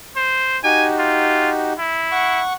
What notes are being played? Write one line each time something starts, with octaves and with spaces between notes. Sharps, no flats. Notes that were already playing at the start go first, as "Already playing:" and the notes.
C5
D#4 F#4 G4 G#5
F4
E4
F#5 C#6